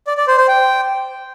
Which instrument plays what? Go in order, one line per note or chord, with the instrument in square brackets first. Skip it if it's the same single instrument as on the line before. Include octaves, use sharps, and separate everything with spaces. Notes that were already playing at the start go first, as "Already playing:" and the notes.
[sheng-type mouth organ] D5
D5
C5
C5
G5